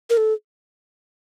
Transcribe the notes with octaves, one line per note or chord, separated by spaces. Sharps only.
A#4
A4